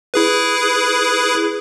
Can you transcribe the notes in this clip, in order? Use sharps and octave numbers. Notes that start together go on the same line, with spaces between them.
E4 G#4 B4